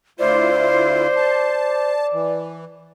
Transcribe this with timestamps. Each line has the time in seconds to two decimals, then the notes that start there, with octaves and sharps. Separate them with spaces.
0.19 D2 E4 F4 C5 D5
1.16 A5
2.13 E3